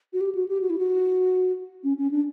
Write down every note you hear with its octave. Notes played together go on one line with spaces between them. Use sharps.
F#4
G4
F#4
G4
F#4
E4
F#4
C#4
C#4
D4